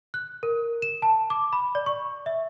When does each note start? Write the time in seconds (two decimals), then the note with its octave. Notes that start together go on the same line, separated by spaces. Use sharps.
0.14 F#6
0.43 A#4
0.82 E7
1.02 A5
1.30 D6
1.53 B5
1.75 D5
1.86 C#6
2.26 E5